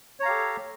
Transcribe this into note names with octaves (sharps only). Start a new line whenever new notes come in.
G4 A4 C#5 F5 A#5